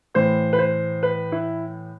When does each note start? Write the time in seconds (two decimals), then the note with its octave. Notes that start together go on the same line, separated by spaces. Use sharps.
0.14 A2 E3 C5
0.53 B4
0.59 C5
1.03 B4
1.32 E4